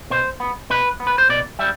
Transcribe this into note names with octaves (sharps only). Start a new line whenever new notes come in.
B2 C5
B3
B2 B4
B3
B4
C5
B2 D5
G3 E5